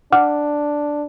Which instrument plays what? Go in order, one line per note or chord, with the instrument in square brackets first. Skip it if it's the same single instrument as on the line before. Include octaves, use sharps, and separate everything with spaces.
[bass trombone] D4 [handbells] F#5 D6 F6